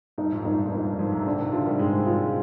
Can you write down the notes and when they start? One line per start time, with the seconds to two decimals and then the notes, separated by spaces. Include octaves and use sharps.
0.18 G2 D#4
0.31 F2 G#2
0.45 G2 A#2 D#4
0.59 G2
0.72 F2 D#4
0.85 G2
0.99 F2 G#2 F3
1.12 G#2 C3
1.26 A#2 D3 D4
1.39 C3 D#3
1.52 D3 F3 F4
1.65 D#3 G3
1.79 G#2 G#3 C4
2.06 F3 G#3 F4